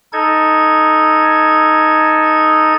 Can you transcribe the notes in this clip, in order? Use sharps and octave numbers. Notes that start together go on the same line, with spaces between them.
D#4 A4 G#6